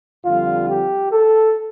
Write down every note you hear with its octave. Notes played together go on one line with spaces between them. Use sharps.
F2 D3 G3 F4
G4
A4